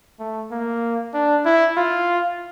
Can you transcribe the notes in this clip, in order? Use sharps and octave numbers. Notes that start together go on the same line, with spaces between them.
A3
A#3
D4
E4
F4